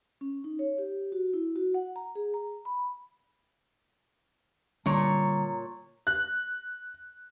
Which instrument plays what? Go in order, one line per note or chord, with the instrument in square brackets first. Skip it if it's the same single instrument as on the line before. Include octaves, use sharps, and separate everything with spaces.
[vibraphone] C#4
D#4
C#5
G4
F#4
E4
F#4
F#5
A#5
G#4
A#5
B5
[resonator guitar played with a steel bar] A#2 C#5 [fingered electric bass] D3 G3 C#4 [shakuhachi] A#5
[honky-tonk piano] F#6